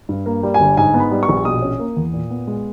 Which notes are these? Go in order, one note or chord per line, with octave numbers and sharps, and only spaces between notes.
G2
A#3
G3
G#5
G1
G#2 G#5
B3
B5
G3
C#6
A#1
B2 D#6
C#4
A#3
E2
A#2
B3
G#3